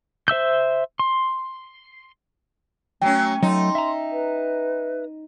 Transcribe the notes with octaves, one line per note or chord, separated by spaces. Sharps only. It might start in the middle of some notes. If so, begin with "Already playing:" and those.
C5 E5 E6 G6
C6
F#3 A3 C#4 G5
F#3 A3 D#4 C6
E5 A#5
B4